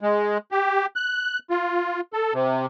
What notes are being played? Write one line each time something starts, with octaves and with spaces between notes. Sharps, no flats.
G#3
G4
F#6
F4
A4
C3